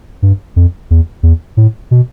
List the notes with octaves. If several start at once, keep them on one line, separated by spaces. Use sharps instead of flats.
G2
F2
E2
E2
A2
B2